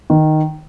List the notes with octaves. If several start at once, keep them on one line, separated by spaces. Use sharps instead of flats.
D#3